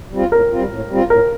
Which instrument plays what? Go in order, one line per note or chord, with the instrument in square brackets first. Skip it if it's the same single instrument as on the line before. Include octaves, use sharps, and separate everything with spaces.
[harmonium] G3 C4 F4
[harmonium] A2 [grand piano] A#4
[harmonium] G3 C4 F4
A2
G3 C4 F4
[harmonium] A2 [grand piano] A#4